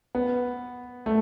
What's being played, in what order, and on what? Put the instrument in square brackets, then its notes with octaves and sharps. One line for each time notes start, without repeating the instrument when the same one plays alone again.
[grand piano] B3
A3